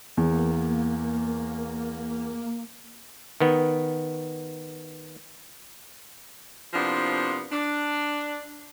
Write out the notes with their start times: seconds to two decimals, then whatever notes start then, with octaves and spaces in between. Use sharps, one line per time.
0.17 E2 A#3
3.40 D#3 B3
6.74 C3 F3 A#3 B3 D4 E4
7.51 D4